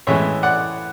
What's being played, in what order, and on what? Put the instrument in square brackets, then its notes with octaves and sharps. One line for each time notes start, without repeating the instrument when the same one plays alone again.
[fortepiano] A2 E3 G#3 C#4 C#5 E5
D5 F#5